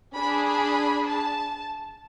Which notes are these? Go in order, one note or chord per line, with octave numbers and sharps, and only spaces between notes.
D4 G#4 B5
B5
A5